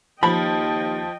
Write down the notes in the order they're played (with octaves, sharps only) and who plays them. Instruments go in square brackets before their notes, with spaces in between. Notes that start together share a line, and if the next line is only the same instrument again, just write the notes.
[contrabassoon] D#2 [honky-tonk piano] F3 [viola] D#5 G5 [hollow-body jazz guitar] B5